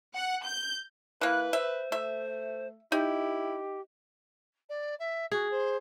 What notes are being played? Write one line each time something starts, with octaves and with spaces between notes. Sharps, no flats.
F#5
G6
E3 A#3 B4 F#6
C5 E5
A3 E5
D#4 E4 G4
D5
E5
F#4 G#4
C5